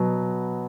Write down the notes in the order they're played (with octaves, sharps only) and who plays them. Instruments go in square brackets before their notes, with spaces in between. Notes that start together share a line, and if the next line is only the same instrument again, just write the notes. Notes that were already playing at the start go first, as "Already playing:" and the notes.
Already playing: [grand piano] B2 F#3 B3